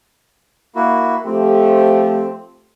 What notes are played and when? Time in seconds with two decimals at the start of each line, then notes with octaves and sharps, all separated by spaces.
0.75 A#3 E4 F#4
1.26 F3 A3 C4 G4